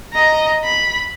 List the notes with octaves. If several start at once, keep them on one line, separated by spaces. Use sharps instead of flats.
D#5 A#5
B5